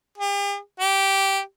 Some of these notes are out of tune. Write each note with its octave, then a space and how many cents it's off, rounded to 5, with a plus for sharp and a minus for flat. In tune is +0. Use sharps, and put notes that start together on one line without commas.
G4 +45
G4 -10